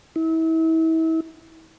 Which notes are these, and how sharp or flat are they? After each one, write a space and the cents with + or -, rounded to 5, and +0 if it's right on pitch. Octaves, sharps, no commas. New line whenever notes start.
E4 -35